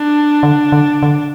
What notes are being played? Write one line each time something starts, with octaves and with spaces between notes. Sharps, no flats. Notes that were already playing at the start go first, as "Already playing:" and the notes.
Already playing: D4
D3
D3
D3